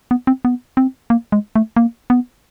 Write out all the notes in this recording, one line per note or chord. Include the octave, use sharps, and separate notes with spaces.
B3
C4
B3
C4
A#3
G#3
A3
A#3
B3